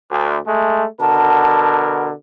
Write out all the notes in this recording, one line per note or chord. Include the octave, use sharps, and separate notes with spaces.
D2
G#3 A3
B2 D3 A#4 A5